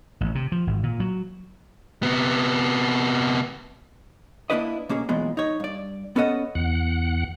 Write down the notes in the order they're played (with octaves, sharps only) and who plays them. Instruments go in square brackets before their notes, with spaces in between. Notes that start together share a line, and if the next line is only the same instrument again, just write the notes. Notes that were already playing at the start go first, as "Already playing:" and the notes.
[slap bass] A1
C3
F3
G#1
A#2
F#3
[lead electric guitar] C3 B3
[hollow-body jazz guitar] A#3 C4 D4 E4 B4 D#5
B2 A#3 C#4 G#4
B1 E2 A#2 F#3 G#3 B3
D#4 C#5
G2 D5
B3 C#4 A4 D#5 F#5
[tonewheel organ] E2 F#5